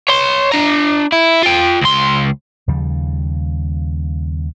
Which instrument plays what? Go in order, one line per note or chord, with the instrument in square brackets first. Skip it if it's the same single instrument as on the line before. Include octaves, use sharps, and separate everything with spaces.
[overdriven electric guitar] C#5 C6
D4 A#5
E4
F4 G5
C#2 C6
[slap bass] D#2 C#3 F3 G3